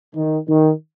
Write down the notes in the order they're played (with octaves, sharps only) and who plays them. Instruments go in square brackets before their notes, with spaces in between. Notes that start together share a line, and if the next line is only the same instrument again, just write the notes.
[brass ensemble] D#3
D#3